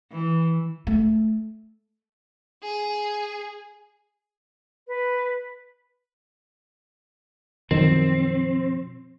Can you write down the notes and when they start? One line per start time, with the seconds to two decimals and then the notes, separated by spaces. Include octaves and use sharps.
0.12 E3
0.87 A3
2.63 G#4
4.88 B4
7.71 F#2 B2 D#3 F3 C4